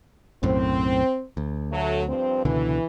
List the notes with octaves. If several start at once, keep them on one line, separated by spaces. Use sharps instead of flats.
B1 F#2 A2 C4
D2
F#3 A3
G2 F3 C4
C#2 B2 D3 E3